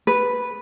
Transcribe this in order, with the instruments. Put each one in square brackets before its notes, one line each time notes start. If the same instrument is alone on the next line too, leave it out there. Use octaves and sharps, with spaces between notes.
[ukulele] B4